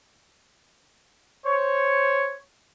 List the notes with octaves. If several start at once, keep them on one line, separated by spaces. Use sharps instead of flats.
C5 C#5